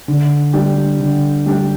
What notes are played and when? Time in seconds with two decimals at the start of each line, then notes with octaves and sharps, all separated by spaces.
0.08 D3
0.53 G3 D4 G4
1.00 D3
1.46 G3 D4 G4